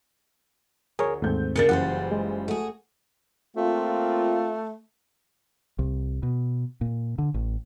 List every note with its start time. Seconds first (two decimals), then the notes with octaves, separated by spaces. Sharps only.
0.99 D2 G#4 A#4 C#5
1.22 D#2 G#2 A3 C4 G6
1.56 C#3 A#3 D4 A6 C#7
1.69 F#1 C#3 E3 G3 F4 C5 F#5
2.12 G#3
2.48 A3 F#4 G#4
3.56 A3 A#3 C4 F4
5.79 C2
6.23 B2
6.81 A#2
7.18 D3
7.34 A1